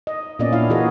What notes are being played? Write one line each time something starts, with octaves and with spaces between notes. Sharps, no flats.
D#5
A#2 A#3 B3 C#4 D5 D#5
A#3 D4 E4 F5
E3 A#3 F#4 G#4 A#4 D#5